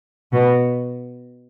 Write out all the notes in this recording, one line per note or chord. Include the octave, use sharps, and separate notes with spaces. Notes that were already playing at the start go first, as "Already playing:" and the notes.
B2